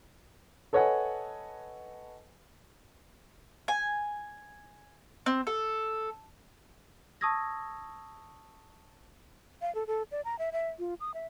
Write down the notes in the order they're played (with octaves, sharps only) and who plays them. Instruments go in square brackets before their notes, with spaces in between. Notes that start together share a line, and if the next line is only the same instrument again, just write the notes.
[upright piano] A4 B4 C#5 D#5 F#5 G#5
[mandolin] G#5
C4
A4
[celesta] A5 C#6 D#6 E6 G#6 A#6
[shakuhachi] F5
A4
A4
D5
A#5
E5
E5
F4
D#6
E5